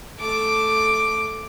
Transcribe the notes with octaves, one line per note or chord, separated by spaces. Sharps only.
A3 D6